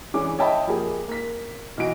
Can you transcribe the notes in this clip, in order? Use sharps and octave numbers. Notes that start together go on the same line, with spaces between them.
E3 C#4 D4 G#4 D6
C#5 D#5 E5 G5 A5 B5
F3 A#3 G4 G#4
A#3 B6
B1 E3 F#4 D#5 D7